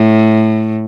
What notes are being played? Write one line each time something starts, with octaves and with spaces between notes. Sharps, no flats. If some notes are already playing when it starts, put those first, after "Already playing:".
Already playing: A2